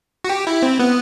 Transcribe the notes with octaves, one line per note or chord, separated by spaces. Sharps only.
F#4
G4
E4
C4
B3